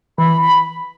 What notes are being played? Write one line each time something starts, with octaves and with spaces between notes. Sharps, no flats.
E3 B5
B5